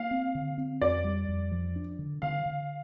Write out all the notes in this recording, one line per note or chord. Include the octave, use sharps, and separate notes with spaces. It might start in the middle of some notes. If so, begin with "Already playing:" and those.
Already playing: A#3 F5
C4
D3
C4
F2 D5
G3
F2
F3
D4
D3
D3 F5
D3